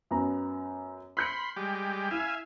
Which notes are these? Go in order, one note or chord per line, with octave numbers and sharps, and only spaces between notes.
F#2 B3 A#5
B5 C6 F6 G6 C#7
G3 G#3 G4
E4 E5 F5 G#5